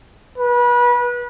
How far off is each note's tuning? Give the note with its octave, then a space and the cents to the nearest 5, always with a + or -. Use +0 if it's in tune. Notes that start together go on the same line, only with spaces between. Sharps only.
B4 -30